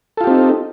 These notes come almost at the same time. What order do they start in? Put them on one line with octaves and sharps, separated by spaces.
A4 F4 G4 C4 D#4